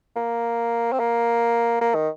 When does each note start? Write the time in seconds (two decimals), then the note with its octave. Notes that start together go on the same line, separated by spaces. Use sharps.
0.16 A#3
0.93 C4
1.00 A#3
1.81 A#3
1.95 D#3